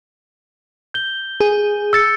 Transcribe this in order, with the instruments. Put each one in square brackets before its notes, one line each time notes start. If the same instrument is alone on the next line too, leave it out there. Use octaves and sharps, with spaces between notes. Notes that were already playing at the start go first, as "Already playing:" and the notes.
[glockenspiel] G6 G7
[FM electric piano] G#4
[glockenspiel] E6 A6 C#7